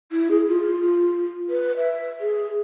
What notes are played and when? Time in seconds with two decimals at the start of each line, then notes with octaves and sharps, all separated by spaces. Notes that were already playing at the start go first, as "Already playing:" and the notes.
0.11 E4
0.30 G#4
0.47 F4
1.49 B4
1.77 E5
2.19 G#4